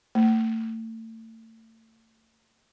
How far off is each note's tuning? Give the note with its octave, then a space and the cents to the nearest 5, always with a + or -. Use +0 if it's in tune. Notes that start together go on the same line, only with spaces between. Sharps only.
A3 +35